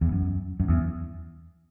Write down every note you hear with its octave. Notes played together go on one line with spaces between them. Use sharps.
E2
F#2
F#2
E2